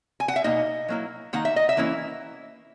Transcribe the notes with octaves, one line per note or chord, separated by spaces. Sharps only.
G#5
F#5
E5
B2 A#3 D#4 D#5
F#3 A#3 E4
D#3 A#3 D#4 F#5
E5
D#5
E5
E3 A#3 C#4 E4